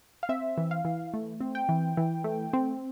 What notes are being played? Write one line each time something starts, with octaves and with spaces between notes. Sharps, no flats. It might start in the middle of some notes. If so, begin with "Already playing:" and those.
F5
C4 E5
E3
F5
E3
A3
C4
G5
E3
E3
A3
C4